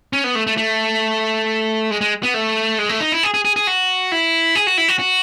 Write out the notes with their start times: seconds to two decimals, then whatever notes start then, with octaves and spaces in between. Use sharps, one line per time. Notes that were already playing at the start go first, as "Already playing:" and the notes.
0.13 C#4
0.24 B3
0.35 A3
0.47 A3
0.57 A3
1.91 G#3
2.01 G#3
2.23 B3
2.34 A3
2.79 G#3
2.89 A3
3.00 D#4
3.12 E4
3.23 G#4
3.34 G#4
3.45 G#4
3.56 G#4
3.67 F#4
4.12 E4
4.55 G#4
4.67 F#4
4.78 E4
4.88 F#4
4.99 F#4